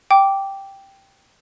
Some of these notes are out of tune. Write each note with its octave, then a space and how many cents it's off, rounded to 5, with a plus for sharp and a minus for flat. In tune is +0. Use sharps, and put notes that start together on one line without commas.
G5 +0 D6 -5